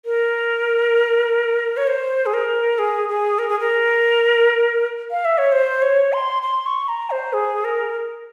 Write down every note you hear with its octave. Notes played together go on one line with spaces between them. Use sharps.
A#4
C#5
C5
G#4
A#4
G#4
G#4
A#4
G#4
A#4
F5
E5
C#5
C5
C#5
C6
C6
C#6
A#5
C5
G#4
A#4